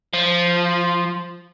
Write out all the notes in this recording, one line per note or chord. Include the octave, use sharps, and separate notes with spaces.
F3